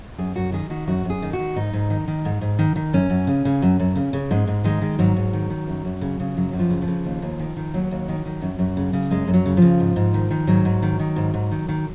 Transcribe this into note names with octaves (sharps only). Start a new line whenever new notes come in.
F#2 G#4
F#2 F#4
D#3 G#4
D#3 F#4
F#2 F#4
F#2 G#4
D#3
F#4
D#3
G#2 D#4
G#2
D#3
D#3
G#2
G#2
D#3
D#3
F#2 C#4
F#2
C#3
C#3
F#2
F#2
C#3
C#3
G#2 G#3
G#2
D#3 G#3
D#3
G#2 F#3
G#2
D#3
D#3
F#2
F#2
C#3
C#3
F#2 F#3
F#2
F3
C#3
F3
C#3
D#2
D#2
D#3
D#3
D#2 F#3
D#2
D#3
D#3
F#2
F#2
C#3
C#3
F#2 G#3
F#2
F#3
C#3
C#3 F3
G#2
G#2
D#3
D#3
G#2 F#3
G#2
D#3
D#3
G#2
G#2
D#3
D#3